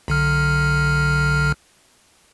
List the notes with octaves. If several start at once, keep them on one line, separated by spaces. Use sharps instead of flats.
B1 D3 F6